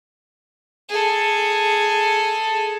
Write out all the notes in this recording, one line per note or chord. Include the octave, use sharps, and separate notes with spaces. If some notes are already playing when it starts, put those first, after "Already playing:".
G#4 A4